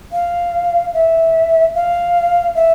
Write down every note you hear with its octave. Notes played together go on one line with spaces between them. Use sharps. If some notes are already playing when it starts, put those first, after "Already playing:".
F5
E5
F5
E5